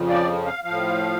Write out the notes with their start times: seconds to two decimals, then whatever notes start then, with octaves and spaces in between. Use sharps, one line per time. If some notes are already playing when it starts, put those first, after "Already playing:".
Already playing: F2 C#3 F3
0.09 D5
0.46 F5
0.64 A2 F3 F5